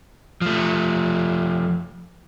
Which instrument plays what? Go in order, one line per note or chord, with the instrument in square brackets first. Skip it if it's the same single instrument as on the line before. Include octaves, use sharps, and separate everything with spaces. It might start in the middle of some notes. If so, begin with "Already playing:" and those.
[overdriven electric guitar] F3 A3